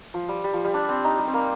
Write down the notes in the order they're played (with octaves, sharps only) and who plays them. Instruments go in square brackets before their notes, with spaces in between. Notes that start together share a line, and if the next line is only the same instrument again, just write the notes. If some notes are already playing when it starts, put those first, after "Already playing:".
[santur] F3
G3
G3
F3
G3
D4
C4
D#4
G3
C4
A#3